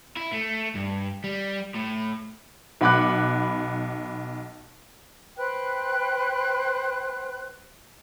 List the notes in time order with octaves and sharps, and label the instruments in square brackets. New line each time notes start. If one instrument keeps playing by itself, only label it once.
[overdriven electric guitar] E4
A3
G2
G3
A2
[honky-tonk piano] B1 F#5 B5 D6 F#6
[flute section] B4 C5 G5 F#6